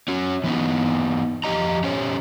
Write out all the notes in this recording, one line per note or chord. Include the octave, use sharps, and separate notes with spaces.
C#4 F#4
E3 B3 D#4
F2 G#3 G4 D#5 A#5
C#4 G4 C5 C#5